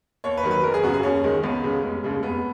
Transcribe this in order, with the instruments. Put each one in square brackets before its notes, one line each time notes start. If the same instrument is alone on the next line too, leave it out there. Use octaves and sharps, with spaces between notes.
[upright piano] D#2 C#5
B4
D#3 F#3
B4
F#1 A#4
G#4
F#2 C#3 F#4
G#4
D#2 C#4
D#3 G#3
C#2 B3
C#3 G#3
F1
D#2 C#3 G#3
F1 B3